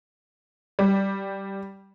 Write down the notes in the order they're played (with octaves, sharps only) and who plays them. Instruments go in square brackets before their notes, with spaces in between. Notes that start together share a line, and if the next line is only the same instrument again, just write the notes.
[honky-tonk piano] G3